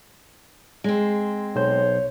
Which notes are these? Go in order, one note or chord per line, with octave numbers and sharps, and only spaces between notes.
G#3 C4
B1 C5 C#5